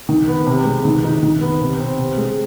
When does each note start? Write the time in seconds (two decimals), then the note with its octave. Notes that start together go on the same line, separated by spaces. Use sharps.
0.09 D#3
0.28 B3
0.47 C3
0.65 G#3
0.85 D#3
1.04 D#4
1.23 D#3
1.41 B3
1.61 C3
1.80 C4
1.99 C3
2.18 G#3